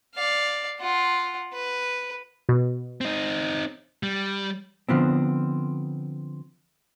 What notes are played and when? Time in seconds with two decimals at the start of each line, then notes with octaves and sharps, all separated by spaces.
0.15 D5 F5
0.79 F4 F#5
1.53 B4
2.49 B2
3.01 C4 D#4
4.03 G3
4.89 D3 F3 B3 C4